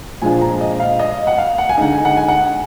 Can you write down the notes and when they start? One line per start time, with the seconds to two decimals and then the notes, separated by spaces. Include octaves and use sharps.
0.22 A#2 F3 G#3 D4 F4 G#5
0.41 A#5
0.61 D#5
0.80 F5
1.00 D#5
1.27 F#5
1.38 F5
1.58 F#5
1.69 G#5
1.78 D3 G#3 D#4 F#5
1.93 G#5
2.05 F#5
2.17 G#5
2.28 F#5